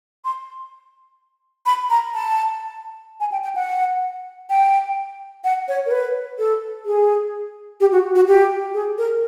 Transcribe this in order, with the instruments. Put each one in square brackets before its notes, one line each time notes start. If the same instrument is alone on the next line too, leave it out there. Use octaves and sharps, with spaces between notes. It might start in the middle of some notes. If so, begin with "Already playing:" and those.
[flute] C6
B5
A#5
A5
G#5
G5
G5
F#5
G5
F#5
C#5
A#4
B4
A4
G#4
G4
F#4
F#4
G4
G#4
A#4